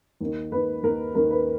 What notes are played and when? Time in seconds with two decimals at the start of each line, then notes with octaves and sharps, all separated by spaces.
0.21 D#2 D#3
0.52 D#2 D#3 B4
0.83 D#2 D#3 A#4
1.15 D#2 D#3 A#4
1.31 B4